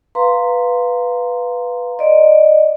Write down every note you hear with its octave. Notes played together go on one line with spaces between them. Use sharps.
B4 F5 A#5 C6
D5 D#5